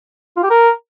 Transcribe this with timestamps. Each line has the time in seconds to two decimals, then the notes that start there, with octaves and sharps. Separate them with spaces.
0.37 F4
0.43 G4
0.50 A#4